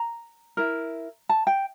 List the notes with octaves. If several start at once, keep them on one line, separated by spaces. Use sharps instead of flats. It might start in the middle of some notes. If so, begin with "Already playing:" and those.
Already playing: A#5
E4 A#4
A5
G5